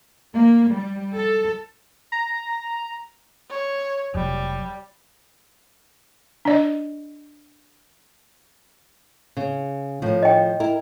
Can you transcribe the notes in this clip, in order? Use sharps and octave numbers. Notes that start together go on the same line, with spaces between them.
A#3
G3
A4
A#5
C#5
F1 F#3 G3
D4 D5 D#5
C#3
A2 D#3 F3
D#5 G5
E4 A#4